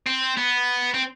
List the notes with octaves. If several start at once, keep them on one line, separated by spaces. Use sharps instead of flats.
C4
B3
C4